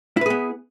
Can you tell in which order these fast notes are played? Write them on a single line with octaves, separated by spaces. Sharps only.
E4 B4 G#4 B3